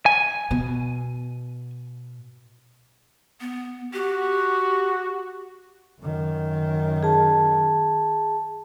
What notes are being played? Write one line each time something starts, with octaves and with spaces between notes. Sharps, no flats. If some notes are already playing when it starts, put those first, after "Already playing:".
G#5
B2
B3
F#4 G4
F#2 D#3
G#4 A5